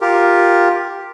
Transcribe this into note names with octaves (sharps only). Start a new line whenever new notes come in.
F4 G4 A#4